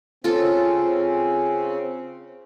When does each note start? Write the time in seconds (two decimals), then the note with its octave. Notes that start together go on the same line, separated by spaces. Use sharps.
0.24 C#3 C4 C#4 F4 A4